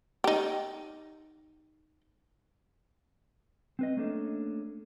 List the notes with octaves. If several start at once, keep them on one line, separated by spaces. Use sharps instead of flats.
D#4 G4
C4 B4 D#5
A3 A#3 C#4 D4 A4